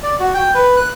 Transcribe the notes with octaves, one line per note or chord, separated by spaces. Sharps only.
D5
F#4
G5
B4
F#6